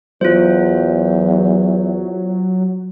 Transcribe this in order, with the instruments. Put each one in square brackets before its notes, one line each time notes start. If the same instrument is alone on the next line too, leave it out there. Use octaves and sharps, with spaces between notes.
[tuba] E2 [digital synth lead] F#3 [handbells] F4 C5